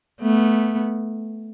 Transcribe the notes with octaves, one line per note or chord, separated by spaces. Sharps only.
A3 B3